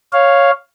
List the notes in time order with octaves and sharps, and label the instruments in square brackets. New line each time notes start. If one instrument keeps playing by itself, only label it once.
[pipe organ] C#5 F5